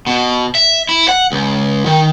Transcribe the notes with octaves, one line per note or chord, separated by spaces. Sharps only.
B2
E5
E4
F#5
C#2
D#3